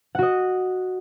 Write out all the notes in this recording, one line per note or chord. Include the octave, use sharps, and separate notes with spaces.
F#4 D#5 F#5